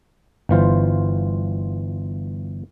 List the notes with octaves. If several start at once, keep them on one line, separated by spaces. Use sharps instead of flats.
G1 E3 F4 C5